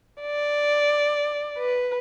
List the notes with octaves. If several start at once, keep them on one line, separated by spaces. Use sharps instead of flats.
D5
B4